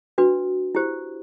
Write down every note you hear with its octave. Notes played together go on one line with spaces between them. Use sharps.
D4 F#4 B4
E4 G4 C5